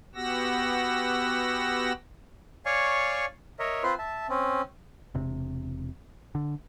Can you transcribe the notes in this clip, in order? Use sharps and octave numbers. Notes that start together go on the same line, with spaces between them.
B3 F#4 G4 F#5 E6 A#6
C#5 D5 F5 G#5 C#6
A#4 C#5 D#5 E5
C4 F4 B4 C5 C6
E5 A5
C4 C#4
E1 C3
D3